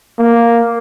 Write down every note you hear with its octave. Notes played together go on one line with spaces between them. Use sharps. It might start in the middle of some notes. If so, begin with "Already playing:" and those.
A#3